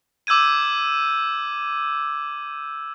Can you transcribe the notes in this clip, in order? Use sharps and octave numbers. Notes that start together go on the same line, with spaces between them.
D6 E6 G6 G#6 D#7